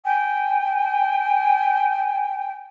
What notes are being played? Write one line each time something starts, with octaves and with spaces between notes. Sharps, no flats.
G5 G#5